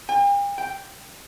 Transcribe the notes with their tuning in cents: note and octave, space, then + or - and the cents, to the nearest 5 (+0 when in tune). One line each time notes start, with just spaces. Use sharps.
G5 +45
G5 +0